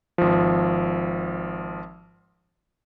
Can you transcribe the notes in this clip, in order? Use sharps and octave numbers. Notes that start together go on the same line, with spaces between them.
G#1 F3